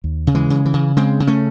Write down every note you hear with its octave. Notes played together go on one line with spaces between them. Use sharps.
D#2
C#3
E3 G#3
C#3
E3
C#3
C#3 G#3 C4
C#3
A3 C#4